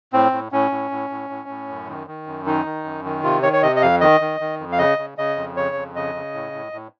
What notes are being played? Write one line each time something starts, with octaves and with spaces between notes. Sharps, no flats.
A2 C4
A2
A2 C#4
A2
A2
A2
A2
A2
F#2
D#3
D#3
F#2
D#3 D#4
D#3
F#2
D#3
C3 F4
D#3 C#5
C#5
C3 D#5
D#5
F2 F5
D#3 D#5
D#3
D#3
F2
F5
C#3 D#5
C#3
C#3 D#5
F2
C#3 C#5
F2
C#3 D#5
C#3
A2
A2
A2